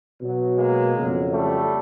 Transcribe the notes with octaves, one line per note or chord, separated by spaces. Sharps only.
B2 F#3
G#3 A#3
F2 C#3 F#3
G3 A3